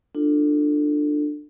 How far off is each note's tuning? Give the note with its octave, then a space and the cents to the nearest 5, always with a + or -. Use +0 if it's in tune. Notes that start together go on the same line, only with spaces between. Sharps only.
D4 +20 F4 +0 A4 +15